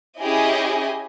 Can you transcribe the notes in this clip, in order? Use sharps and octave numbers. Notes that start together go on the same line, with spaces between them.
C#4 E4 G4 G#4 D#5 G#5